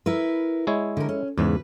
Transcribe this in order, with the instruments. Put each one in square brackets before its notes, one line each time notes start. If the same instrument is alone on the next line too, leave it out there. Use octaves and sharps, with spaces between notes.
[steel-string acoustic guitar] E4 A#4 B4
[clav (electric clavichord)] G#3 E4 C#5
[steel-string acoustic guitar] D3 A#4
C#4
[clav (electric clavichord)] E2 G#2 C#3 [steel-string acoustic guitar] B4